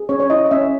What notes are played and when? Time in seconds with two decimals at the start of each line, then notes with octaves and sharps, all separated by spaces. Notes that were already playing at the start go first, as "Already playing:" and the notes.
Already playing: G#4
0.09 C#4 C#5
0.20 C#5
0.30 E4 D#5
0.46 D#5
0.51 C#4 E5